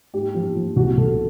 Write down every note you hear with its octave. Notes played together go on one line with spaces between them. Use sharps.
G#2 G4
F3
F3
C2 F#4
C2 A4